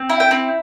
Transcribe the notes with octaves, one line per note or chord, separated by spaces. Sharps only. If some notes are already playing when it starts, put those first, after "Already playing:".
Already playing: C4
E4
G5
C4